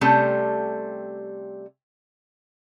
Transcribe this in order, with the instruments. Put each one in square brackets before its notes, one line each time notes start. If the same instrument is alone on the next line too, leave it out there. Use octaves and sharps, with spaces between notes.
[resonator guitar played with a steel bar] C3 G3 A3 C#4 A4